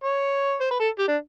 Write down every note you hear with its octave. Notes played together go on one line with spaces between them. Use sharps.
C#5
C5
B4
A4
G4
D4